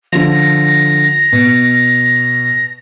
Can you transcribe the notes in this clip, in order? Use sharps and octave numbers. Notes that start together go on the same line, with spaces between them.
D3 F3 A#6
B2